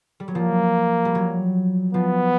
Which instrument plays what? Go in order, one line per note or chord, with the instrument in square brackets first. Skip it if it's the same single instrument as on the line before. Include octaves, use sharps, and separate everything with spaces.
[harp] G3
F#3
[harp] F3 [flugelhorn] A#3
[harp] G3
F#3
[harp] F3 [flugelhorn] B3